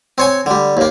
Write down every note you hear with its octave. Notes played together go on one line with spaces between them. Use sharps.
C4 C#5 G#5
D3 G3
D#2 A#3